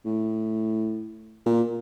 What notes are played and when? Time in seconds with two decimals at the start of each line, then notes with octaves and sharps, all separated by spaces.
0.05 A2
1.46 A#2